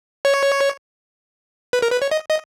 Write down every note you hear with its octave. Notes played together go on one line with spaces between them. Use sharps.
C#5
B4
A#4
B4
C#5
D#5
D#5